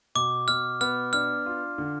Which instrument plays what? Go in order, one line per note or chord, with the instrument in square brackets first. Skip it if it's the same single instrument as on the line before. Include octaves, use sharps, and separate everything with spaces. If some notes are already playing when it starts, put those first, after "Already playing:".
[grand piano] B2 [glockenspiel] D6
[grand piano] B2 [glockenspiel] F6
[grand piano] B3 [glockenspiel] F6
[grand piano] D4 [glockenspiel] F6
[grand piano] F4
D3